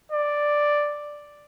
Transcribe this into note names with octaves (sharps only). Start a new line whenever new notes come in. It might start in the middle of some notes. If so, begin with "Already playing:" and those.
D5